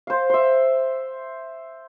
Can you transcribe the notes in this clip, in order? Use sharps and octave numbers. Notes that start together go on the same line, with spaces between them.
C5 F5
C5 E5